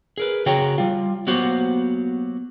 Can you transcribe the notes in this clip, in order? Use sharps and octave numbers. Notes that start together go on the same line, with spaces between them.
G#4 A#4 B4
C#3 F#4 G#4 C#5 G5 A#5
G3 F4
F#3 A#3 B3 F#4 G4 C5